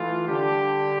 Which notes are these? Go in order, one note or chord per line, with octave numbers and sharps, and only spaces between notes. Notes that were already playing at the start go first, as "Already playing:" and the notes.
Already playing: E3 A3 F4
D3 G3 D4 G4